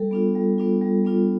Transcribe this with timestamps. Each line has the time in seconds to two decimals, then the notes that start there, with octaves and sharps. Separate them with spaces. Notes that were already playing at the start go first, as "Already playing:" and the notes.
Already playing: G3 A4
0.11 B3 D4 F4
0.35 G3
0.58 B3 D4 F4
0.82 G3
1.05 B3 D4 F4